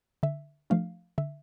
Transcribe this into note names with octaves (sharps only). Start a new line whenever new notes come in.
D3 E5
F3 A3 D4 F5
D3 E5